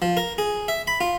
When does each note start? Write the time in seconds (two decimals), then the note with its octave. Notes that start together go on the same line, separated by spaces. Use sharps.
0.02 F3
0.17 A#4
0.38 G#4
0.68 E5
0.87 B5
1.01 F4